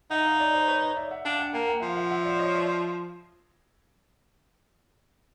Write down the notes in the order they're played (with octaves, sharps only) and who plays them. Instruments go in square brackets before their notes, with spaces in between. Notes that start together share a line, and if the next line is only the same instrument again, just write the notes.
[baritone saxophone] D#4 [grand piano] E5 F#5
[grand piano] D#5 F5
D5 E5
C5 D5
B4 C#5
C#5 D#5
D5 E5
E5 F#5
[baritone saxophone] D4 [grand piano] F5 G5
[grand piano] F#5 G#5
[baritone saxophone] A#3 [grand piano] G5 A5
[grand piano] F#5 G#5
[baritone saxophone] F3 [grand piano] E5
[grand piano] F5
E5 F#5
E5 F#5
D5 E5
C#5 D#5
D5 E5